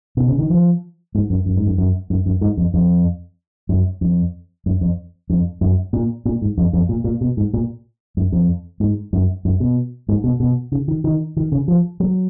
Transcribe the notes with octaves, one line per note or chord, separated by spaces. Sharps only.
B2
C#3
D#3
F3
G#2
F#2
F#2
G#2
F#2
F#2
F#2
F#2
G#2
F2
F2
F#2
F2
F#2
F2
F2
F#2
A#2
A#2
G#2
F2
F2
A#2
A#2
B2
G#2
A#2
F#2
F2
G#2
F#2
F#2
B2
G#2
B2
B2
C#3
D#3
D#3
D#3
C#3
F3
F#3